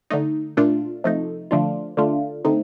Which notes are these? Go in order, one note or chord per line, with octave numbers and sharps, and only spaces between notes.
D3 A3 D#4
A#2 A3 D4 F4
C3 F3 A3 D#4
D3 F3 A3 D4 F4
D3 A3 D4 F4
D3 A3 C4 D#4